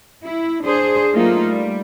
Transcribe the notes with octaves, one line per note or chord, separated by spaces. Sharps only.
E4
D4 G#4 C5
F#3 A3 A#3 D#4 F4
G3